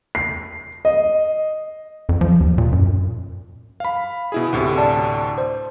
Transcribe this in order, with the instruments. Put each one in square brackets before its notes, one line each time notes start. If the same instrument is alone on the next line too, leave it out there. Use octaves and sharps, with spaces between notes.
[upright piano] C7
D#5
[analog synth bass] F2
F3
D#2
A#2
F#2
[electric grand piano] F5 B5
B2 E4 G#4
D2 A2 C3
[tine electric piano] D5 A5
C5